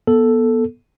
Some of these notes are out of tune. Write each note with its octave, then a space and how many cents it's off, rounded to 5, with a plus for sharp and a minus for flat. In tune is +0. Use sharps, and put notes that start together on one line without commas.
B3 -25 A4 +0